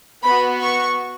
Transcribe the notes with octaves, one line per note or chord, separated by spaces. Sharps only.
B3 F#4 B5
C#6